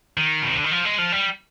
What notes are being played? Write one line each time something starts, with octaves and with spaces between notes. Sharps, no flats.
D#3
B2
C3
D3
D#3
F3
G#3
F3
G3